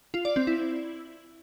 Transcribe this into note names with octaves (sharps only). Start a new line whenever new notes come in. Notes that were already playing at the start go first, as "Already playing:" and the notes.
F4
D5
C4
E4